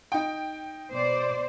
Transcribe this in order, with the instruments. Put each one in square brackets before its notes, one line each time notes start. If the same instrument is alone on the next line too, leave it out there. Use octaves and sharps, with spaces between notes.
[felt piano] D#4 G5
[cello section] B2 C5 D5